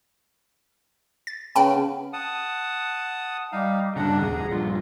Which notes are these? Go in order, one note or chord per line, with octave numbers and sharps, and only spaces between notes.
A6
C#3 B3 C#4 G5 A5 B5
F#5 A5 D#6
G3 D#4 F5
G2 C#3 D4 F#5 A#5
D#1 A1 D#2 G#4
A#1 G2 F4